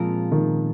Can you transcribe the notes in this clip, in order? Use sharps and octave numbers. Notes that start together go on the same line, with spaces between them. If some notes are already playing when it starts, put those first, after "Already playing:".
Already playing: A#2 F3 G#3 C4 F4 A#4
D#3